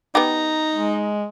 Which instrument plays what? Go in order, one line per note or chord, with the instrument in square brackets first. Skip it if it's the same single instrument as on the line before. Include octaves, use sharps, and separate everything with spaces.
[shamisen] B3 G4 [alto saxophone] D#4 [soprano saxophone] A#5
[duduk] G#3